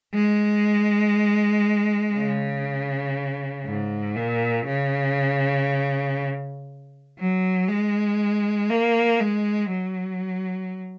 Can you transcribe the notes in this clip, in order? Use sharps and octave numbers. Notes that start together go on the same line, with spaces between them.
G#3
C#3
G#2
A#2
C#3
F#3
G#3
A#3
G#3
F#3